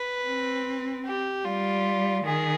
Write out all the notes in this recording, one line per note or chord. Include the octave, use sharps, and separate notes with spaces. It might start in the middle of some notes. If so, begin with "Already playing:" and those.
Already playing: B4
C4
G4
G3 F4
D#3 G#4